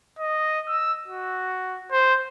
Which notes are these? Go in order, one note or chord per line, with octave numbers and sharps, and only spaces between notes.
D#5
E6
F#4
C5